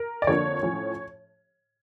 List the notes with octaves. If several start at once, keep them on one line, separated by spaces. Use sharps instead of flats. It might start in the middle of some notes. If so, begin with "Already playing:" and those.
Already playing: A#4
D5
F2 D3 F3 A#3 D4 C#5
A2 F3 C#4